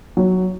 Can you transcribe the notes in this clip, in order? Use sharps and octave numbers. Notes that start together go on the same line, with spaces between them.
F#3